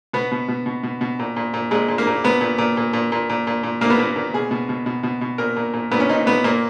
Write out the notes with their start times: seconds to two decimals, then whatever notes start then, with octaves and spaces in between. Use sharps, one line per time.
0.13 B2 B3
0.32 B2
0.48 B2
0.66 B2
0.83 B2
1.01 B2
1.19 A#2
1.36 A#2
1.54 A#2
1.71 A#2 G#3
1.88 A#2
1.98 A#3
2.07 A#2
2.24 A#2 B3
2.41 A#2
2.58 A#2
2.77 A#2
2.93 A#2
3.12 A#2
3.30 A#2
3.47 A#2
3.63 A#2
3.81 A#2 A#3
3.90 B3
3.99 A#2 A#3
4.16 A#2
4.34 B2 G#4
4.51 B2
4.69 B2
4.86 B2
5.03 B2
5.21 B2
5.38 A#2 A#4
5.56 A#2
5.73 A#2
5.91 A#2 B3
6.00 C#4
6.09 A#2 D#4
6.26 A#2 B3
6.44 A#2 A#3